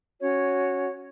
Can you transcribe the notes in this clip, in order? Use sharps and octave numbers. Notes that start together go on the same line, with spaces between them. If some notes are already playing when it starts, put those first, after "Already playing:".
C#4 F#4 C#5